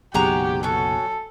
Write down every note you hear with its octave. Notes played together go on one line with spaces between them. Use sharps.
F#1 B1 C3 G#3 F#4 G4 A#5
C#4 F#4 A4